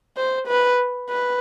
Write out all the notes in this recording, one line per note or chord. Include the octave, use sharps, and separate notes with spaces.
C5
B4
B4